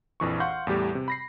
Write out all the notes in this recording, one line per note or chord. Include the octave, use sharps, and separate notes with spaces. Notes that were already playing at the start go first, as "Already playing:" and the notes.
A#1 F2 E3 C#6
F5 F#5 C6 C#6 G6
E2 A2 G3 G4
C3
B5 A#6 C7